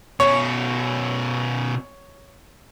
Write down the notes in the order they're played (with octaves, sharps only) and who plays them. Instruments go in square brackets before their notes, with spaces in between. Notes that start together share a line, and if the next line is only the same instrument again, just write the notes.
[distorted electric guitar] B2 C#4 [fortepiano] C#5